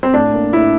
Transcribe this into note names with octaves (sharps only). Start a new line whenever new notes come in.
C4
A2 D4
A#3
A2 E4